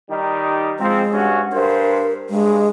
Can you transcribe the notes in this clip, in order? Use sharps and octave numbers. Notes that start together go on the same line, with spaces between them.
D#3 G3 D#4
F3 G#3 C4
G2 C#4 F#4
G2 A#4 C5
G2 G#3